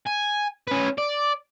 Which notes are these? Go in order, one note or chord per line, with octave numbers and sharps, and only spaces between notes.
G#5
C#4 B4
D5